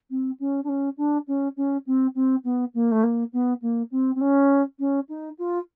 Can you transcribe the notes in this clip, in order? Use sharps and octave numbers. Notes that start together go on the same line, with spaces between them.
C4
C#4
D4
C#4
D4
C#4
C#4
C4
C4
B3
A#3
A3
A#3
B3
A#3
C4
C4
C#4
C#4
D#4
F4